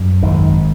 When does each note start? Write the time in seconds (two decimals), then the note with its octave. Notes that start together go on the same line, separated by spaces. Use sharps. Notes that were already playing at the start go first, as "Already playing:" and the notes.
Already playing: F#2
0.22 G#1 D#3